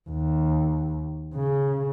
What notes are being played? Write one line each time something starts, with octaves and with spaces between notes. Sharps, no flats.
D#2
C#3